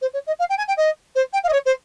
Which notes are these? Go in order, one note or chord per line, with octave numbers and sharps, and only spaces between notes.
C5
C#5
D#5
F5
G5
G#5
G5
D#5
C5
G5
F5
D#5
C#5
C5